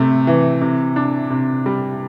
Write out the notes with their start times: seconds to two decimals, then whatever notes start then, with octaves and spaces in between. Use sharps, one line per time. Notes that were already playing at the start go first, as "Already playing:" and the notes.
Already playing: C3 A3
0.27 E3
0.62 C3
0.96 D4
1.30 C3
1.66 G3